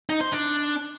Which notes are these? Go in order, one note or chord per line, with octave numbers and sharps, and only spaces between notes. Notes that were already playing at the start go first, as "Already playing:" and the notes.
D#4
C5
D4